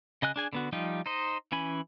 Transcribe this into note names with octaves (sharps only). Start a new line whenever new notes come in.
C#3 D#5 G#5 F#6
D4 G#4 G#5
D3 B3 F#4
F3 G3 D#4 F4 G4
D#4 C5 D#5
E3 C#4 G#5 B5